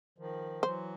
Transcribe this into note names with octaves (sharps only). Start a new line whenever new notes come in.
D#3 F3
E3 F#3 C5